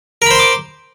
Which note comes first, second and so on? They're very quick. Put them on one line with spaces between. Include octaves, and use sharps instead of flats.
A#4 B5 C5 C6 D6